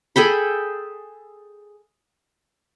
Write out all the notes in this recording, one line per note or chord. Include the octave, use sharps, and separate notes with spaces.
G#4 A4 G5 B5